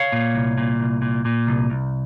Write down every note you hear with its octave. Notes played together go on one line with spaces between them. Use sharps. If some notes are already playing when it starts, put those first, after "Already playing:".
Already playing: C#5 F5
A#2
C2
A#2
C2
A#2
A#2
C2
C2